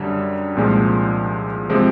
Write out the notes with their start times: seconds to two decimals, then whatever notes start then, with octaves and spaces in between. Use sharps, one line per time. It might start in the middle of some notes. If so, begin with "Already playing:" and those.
Already playing: F#2 D3 G3
0.55 C2 A#2 F3 G#3
1.69 C3 F3 G#3 C4